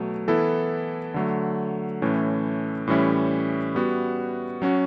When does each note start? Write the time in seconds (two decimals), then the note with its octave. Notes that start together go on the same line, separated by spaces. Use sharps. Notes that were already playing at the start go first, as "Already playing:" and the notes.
Already playing: B2 F#3 A3
0.28 E3 B3 E4 A4
1.14 D3 F#3 A3
2.02 A2 E3 A3 C#4
2.87 A2 E3 G3 C#4 E4
3.75 G3 B3 F#4
4.62 F#3 C#4 F#4